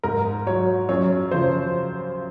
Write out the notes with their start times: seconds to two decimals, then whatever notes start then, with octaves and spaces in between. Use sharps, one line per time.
0.04 G#2 A#4
0.46 F#3 C#5
0.89 F#2 C#5
1.31 C#3 F3 C5